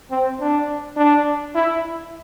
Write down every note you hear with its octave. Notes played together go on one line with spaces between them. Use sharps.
C4
D4
D4
E4